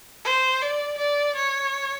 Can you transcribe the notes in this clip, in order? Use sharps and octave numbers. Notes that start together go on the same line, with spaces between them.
C5
D5
D5
C#5